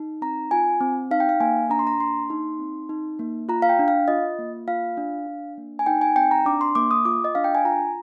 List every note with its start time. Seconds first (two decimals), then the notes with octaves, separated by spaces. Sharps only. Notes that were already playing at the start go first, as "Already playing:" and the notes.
Already playing: D#4
0.22 C4 A#5
0.51 F4 G#5
0.81 C4
1.11 D#4 F5
1.20 G5
1.29 F5
1.40 A#3 G#5
1.70 D4 A#5
1.79 C6
1.87 A#5
2.00 A#3 C6
2.30 D#4
2.59 C4
2.89 D#4
3.19 A#3
3.49 F4 A#5
3.62 F5
3.69 G5
3.79 D4
3.88 F5
4.08 F4 D#5
4.39 A#3
4.68 F4 F5
4.97 D4
5.27 D4
5.58 A#3
5.79 G#5
5.86 D#4 G5
6.01 G#5
6.16 C4 G5
6.31 A#5
6.46 D4 D6
6.61 C6
6.75 A#3 D6
6.91 D#6
7.05 F4 D6
7.24 D#5
7.35 D4 F5
7.44 G5
7.55 G#5
7.65 F4 A#5